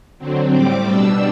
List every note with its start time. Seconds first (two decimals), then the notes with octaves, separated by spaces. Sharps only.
0.18 D3 F#3 C4
0.52 A2 G3 C4 D6
0.86 B2 G3 D4 E6